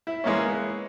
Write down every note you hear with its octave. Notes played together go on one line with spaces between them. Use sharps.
E4
E3 G#3 A#3 C#4
B3